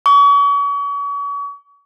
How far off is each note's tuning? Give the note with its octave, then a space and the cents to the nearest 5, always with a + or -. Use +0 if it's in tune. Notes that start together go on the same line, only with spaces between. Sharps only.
C#6 +40